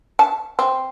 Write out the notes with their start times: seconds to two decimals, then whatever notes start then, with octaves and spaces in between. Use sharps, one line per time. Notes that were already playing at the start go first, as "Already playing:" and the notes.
0.19 A5
0.59 C4